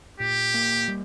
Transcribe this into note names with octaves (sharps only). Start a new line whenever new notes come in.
A#2 G4
A#3
G3